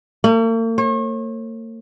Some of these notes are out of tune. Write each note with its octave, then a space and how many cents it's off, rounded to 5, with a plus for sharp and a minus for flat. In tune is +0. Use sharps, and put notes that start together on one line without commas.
A#3 -45
C#5 -40